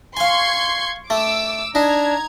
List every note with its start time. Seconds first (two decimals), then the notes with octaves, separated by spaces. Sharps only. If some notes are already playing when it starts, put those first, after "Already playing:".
0.17 F5 G#5 C6 C#6 G#6
1.10 A3 D6 E6
1.75 D4 D#4 A#5 G#6